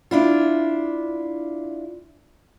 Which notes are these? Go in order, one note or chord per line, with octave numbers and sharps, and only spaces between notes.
D4 E4 F4